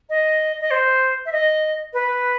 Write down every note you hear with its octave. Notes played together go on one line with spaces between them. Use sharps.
D#5
D#5
C5
E5
D#5
B4